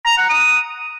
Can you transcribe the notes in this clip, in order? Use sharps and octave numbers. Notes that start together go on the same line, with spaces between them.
A#5
F#5
D#6